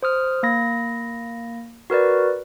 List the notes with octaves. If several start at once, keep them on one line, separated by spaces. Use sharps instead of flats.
C5 D#6 F6
A#3 B5 A#6
F#4 A#4 B4 D5